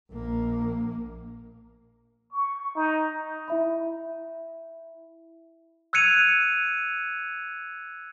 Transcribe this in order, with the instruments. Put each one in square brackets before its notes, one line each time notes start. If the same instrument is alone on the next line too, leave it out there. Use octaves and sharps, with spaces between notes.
[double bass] A#1 A#3
[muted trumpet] C#6
D#4
[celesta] E4 E5 B5
[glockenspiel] E6 F#6 G#6 C#7 D#7 F7